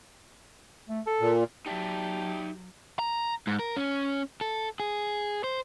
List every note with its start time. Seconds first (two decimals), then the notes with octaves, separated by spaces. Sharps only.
0.89 A3
1.07 A4
1.21 A#2
1.66 F#3 D#4 G4 D5 E5 A5
2.99 A#5
3.47 G#2
3.59 A#4
3.77 C#4
4.41 A4
4.80 G#4
5.44 C5